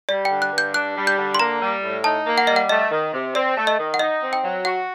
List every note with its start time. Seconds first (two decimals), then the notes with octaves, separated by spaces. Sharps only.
0.09 G3 D5
0.25 G5
0.30 D3
0.42 F#6
0.52 G2
0.58 G6
0.74 D4 F#6
0.96 G3
1.07 G6
1.17 D3
1.34 C6
1.39 A#3 A#5
1.61 G3
1.83 A2
2.04 D#4 A5
2.26 A#3
2.38 F#5
2.47 G3 D#5
2.56 F#5
2.69 A3 D#5
2.91 D#3
3.13 C3
3.35 C4 D5
3.57 A3
3.67 D#5
3.79 D#3
3.94 F#5
3.99 D#4 D#5
4.22 C4
4.33 G5
4.43 F#3
4.65 F#4 F#5